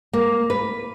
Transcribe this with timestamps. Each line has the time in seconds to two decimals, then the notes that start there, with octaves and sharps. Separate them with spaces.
0.13 A#3
0.50 B4